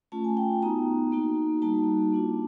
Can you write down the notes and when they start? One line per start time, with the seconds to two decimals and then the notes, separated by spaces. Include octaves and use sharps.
0.12 A3 C#4 F4 A5
0.24 G#5
0.37 G5
0.62 B3 D#4 F#4 A#5
1.12 A#3 D#4 F#4
1.62 G3 A#3 D#4 F#4 A5
2.12 A#3 D4 F4